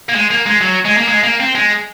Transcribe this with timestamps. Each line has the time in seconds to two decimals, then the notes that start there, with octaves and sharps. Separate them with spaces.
0.09 A#3
0.15 G#3
0.30 A#3
0.46 G#3
0.61 F#3
0.85 G#3
0.98 A#3
1.09 G#3
1.24 A#3
1.40 C4
1.55 G#3